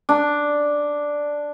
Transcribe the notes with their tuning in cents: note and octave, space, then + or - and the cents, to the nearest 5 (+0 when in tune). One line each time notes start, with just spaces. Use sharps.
D4 +0